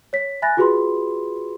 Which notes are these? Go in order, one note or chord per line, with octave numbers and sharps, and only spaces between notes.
C#5 B6
E5 G#5 B5 F#6 A6 A#6
F4 F#4 G#4 B4 B5 C6